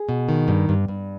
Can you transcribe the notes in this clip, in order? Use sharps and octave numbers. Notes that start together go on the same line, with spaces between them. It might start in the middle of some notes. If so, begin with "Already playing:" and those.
Already playing: G#4
B2
D#3
G2
G2
G2